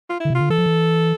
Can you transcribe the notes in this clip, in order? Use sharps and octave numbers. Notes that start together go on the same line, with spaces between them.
F4
D3 E4
C3 F4
D3
E3 A4
F3
E3